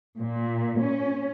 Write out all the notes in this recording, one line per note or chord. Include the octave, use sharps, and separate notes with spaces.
A#2
C#4